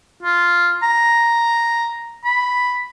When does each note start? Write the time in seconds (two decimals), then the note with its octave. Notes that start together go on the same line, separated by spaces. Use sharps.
0.23 F4
0.83 A#5
2.25 B5